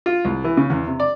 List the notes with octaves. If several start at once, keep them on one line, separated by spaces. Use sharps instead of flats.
F4
C2
E3
C#3
E2
C3
D5